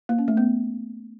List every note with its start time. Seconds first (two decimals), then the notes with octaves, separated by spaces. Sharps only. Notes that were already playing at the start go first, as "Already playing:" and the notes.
0.09 A#3
0.19 C#4
0.28 A3
0.37 B3